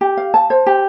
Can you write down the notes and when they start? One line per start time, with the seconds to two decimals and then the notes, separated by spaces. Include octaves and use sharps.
0.01 G4
0.17 F5
0.34 A5
0.50 C5
0.66 G4